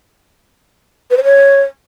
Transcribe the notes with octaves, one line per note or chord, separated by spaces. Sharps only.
B4
C5
C#5